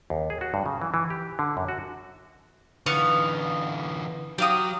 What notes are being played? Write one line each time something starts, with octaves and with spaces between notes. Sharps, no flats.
D#2
G#4
F#4
G2
C#3
E3
E3
G4
D3
F#2
F#4
D3 E3 B3 F5 C#6
F#3 G4 F5 D#6